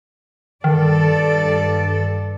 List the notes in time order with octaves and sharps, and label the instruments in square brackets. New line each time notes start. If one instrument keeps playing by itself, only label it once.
[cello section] G2 A4 D5 [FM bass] D#3